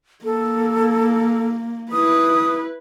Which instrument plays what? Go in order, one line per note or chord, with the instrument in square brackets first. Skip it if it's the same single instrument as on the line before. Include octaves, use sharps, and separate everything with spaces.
[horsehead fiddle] A#3 [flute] A4
[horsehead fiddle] E4 B4 [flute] D#6